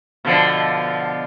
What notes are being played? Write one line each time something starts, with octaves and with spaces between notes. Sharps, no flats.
B2 D3 F3